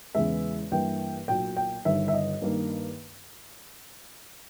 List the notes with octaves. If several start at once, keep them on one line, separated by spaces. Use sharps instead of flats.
E2 C#3 E3 G#3 E5
G2 E3 A#3 G5
B1 A#2 A#3 G5
G5
G1 G2 D#3 E5
E5
D#5
G2 D#3 A#3